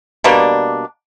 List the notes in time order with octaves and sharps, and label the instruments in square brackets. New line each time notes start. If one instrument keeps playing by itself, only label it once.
[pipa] B2 G3 A#3 D4